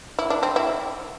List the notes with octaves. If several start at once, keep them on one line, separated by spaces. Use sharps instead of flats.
E4
D4
C4
E4